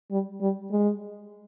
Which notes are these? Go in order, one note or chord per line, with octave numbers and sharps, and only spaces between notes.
G3
G3
G#3